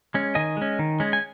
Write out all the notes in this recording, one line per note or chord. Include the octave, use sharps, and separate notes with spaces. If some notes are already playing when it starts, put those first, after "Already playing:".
G#3 C#4
D#3 D#5 G#5
G#3 C#4
D#3
G#3 C#4
G#5